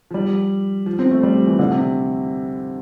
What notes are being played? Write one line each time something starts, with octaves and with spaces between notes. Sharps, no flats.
F3
G3
F3
C4
A3
G3
F3
E3
D3
C3